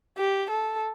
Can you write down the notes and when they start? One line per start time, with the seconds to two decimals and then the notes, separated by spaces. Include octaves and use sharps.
0.17 G4
0.50 A4